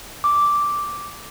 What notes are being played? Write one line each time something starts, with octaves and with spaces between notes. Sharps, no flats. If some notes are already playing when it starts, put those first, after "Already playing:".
D6